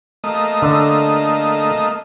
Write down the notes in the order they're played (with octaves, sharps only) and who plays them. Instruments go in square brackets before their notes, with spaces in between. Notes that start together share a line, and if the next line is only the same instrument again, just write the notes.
[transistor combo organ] A3 A#3 D#5
[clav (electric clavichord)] D3